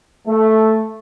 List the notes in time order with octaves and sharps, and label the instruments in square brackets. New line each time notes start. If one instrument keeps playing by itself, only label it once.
[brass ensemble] A3